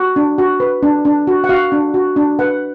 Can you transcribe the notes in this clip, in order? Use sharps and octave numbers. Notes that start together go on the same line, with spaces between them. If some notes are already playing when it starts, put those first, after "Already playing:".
Already playing: F#4
D4
F#4
B4
D4
D4
F#4
F#5
F#4 F5
D4
F#4
D4
B4 F#5